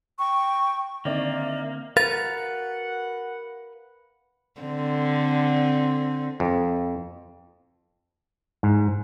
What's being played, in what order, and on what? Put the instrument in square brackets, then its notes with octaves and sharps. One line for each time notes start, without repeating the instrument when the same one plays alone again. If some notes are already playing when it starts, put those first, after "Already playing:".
[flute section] G5 C#6
[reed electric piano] D3 C4 [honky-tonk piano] D#3 D5 [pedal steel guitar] A#3 [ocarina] E5
[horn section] F#4 F#5 [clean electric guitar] A#4 B4 F5 [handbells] A6
[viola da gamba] D3 C4
[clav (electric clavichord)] F2
G#2